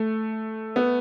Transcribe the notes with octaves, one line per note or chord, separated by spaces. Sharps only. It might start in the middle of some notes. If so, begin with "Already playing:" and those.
Already playing: A3
B3